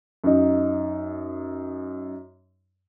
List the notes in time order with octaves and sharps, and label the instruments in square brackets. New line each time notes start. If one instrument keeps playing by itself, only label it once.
[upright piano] F#2 D#4